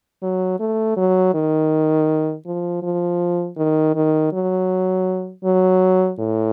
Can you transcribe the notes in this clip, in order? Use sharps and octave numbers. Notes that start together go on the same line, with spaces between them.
F#3
A3
F#3
D#3
F3
F3
D#3
D#3
F#3
F#3
A2